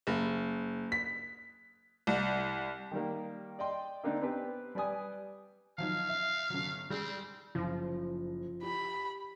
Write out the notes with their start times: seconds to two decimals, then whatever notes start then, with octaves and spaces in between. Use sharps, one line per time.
0.07 F#1
0.92 B6
2.07 C2
2.91 D#3 G3 A#3
3.59 D5 D#5 G5 C6
4.04 D3 A#3 C4 D4 D#4
4.22 B3 C4 G4 B4
4.75 G3 B4 D5 G#5 D#6
5.78 F3 F#3 D#4 F5
6.09 E5
6.50 G1 F#3
6.90 G3 G#3 C4
7.55 F#1 F3 A#6
8.63 G4 B5